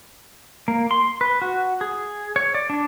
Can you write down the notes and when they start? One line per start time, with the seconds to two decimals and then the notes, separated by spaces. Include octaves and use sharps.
0.68 A#3
0.91 C6
1.21 B4
1.42 F#4
1.81 G#4
2.36 C#5
2.55 D5
2.70 D4